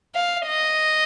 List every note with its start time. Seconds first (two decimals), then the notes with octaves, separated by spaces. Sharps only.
0.15 F5
0.47 D#5